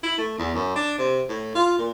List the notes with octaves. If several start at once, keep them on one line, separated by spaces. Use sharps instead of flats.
E4
A3
E2
F#2
D4
C3
A2
F4
A#2